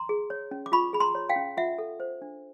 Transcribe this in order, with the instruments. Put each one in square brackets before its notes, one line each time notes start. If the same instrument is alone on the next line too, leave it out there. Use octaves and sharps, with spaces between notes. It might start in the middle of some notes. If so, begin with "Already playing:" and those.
Already playing: [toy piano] A#5 C6
G#4
C#5
C#4
D6
F4 B5 C#6
G#4 B5
A#5 C6
C#5
F5 G5
C#4
F4 E5 F#5
A4
C5
D4